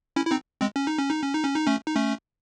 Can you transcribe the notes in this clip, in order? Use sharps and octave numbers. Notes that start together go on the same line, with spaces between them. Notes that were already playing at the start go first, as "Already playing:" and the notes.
C#4 E4
E4
C4 D#4
G#3 C4
C#4
D#4
C#4
D#4
C#4
D#4
C#4
D#4
A3 C#4
D#4
A3 C#4